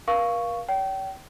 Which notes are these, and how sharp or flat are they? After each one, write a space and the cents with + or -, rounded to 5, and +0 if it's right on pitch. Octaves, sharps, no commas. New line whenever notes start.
A#4 +40 F5 +0 C#6 +0
C#5 +40 G5 -30